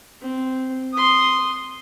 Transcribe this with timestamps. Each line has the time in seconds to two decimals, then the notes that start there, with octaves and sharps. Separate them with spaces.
0.22 C4
0.93 C6 D#6